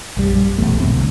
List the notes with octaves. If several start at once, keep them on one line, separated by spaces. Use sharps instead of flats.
A#1 F#2 G3
E1 B1 E2 A3
C2 F#2 B2 C4
C2 A#2 D3